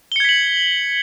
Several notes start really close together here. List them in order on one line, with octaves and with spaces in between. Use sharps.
G7 C#7 G#6 B6 F#7